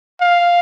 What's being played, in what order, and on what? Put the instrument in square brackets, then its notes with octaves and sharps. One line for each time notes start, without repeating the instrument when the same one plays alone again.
[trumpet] F5